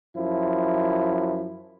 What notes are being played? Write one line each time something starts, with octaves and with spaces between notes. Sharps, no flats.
F#2 F3 E4